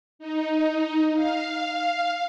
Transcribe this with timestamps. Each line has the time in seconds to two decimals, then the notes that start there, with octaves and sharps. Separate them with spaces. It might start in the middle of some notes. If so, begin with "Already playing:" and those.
0.19 D#4
1.14 F5